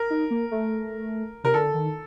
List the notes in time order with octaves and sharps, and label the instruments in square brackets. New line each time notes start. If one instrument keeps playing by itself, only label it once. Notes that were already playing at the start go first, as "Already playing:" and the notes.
Already playing: [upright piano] A#4
[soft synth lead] D#4
A#3
A3
[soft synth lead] C3 [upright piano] A#4
[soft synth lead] D3 [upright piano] A4
[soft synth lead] D#3